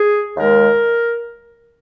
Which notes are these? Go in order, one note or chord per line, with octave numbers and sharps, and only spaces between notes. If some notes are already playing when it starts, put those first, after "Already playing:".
Already playing: G#4
D#2 D#3 G#3 A#4